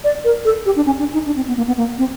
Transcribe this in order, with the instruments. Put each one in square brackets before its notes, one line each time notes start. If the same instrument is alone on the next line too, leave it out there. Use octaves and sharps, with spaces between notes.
[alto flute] D5
A#4
A4
G4
D4
C#4
D4
D#4
D4
C4
B3
A#3
B3
A#3
C4